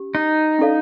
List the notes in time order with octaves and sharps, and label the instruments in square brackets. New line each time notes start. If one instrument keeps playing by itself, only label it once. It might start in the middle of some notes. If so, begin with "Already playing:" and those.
Already playing: [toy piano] C#4 G4
[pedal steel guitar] D#4
[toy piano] C#4 E4 A4 D5 F5